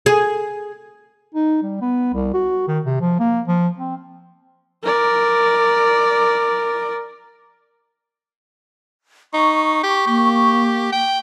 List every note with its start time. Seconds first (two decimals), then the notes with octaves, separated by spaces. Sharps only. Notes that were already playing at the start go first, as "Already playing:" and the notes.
0.06 G#4
1.35 D#4
1.63 G3
1.81 B3
2.14 C2
2.34 F#4
2.68 D#3
2.85 C3
3.01 F3
3.19 A#3
3.48 F3
3.78 C4
4.83 A#4 D5
9.34 D#4 C#6
9.84 G4
10.07 A#3 G4
10.92 G5